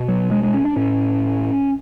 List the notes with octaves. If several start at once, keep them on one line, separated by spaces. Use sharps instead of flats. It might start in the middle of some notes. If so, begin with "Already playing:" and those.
Already playing: B2
F#3
G#3
G#3
C#4
D4
A2 C#4